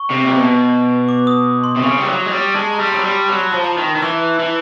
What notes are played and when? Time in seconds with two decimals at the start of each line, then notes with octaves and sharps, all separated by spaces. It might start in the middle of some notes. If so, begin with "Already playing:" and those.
Already playing: C#6
0.11 C3
0.24 A#2
0.35 B2
1.09 D6
1.27 D#6
1.64 C6
1.76 C3
1.82 C#3 C#6
1.98 G3
2.07 F#3
2.26 G#3
2.31 G3
2.56 G#3 A5
2.74 A#5
2.80 G3
2.87 C6
2.92 F#3 B5
3.04 G3 C6
3.11 B5
3.29 F#3 B5
3.41 A#5
3.52 F3 A5
3.64 A#5
3.78 D#3
3.96 D#3
4.02 E3 E6
4.39 E3